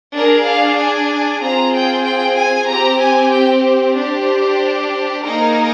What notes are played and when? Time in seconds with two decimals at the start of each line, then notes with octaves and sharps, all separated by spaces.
0.13 D4 G#4 A#4
0.45 F5
0.77 G#5
1.40 C4 F4 G#4 A#5
1.73 G5
2.04 G5
2.36 G#5
2.69 C4 G4 A#5
3.00 G#5
3.32 G5
3.65 C5
3.97 D4 G4
5.24 A#3 D#4 G#4 A#4